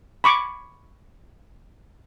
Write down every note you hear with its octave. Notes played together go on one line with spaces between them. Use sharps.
B5 C#6 D6